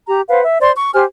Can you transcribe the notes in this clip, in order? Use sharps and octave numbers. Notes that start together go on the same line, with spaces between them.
G4 A#5
B4 C5 F5 F#5
E5
C5 D5 C6
C#6
G4 C5 G#5 F6